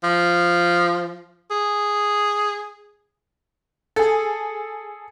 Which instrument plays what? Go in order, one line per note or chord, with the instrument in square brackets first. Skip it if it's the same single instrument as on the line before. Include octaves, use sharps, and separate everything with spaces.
[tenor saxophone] F3
G#4
[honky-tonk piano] G#4 A4